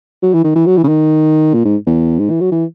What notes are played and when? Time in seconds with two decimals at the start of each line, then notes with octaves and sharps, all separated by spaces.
0.23 F#3
0.33 E3
0.44 D#3
0.55 E3
0.66 F#3
0.77 E3
0.84 C#3
0.88 D#3
1.54 A#2
1.65 G#2
1.87 E2
2.19 G#2
2.30 E3
2.41 F#3
2.52 E3